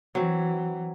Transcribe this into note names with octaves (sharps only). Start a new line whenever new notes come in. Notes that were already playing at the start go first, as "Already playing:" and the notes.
E3 F#3 C4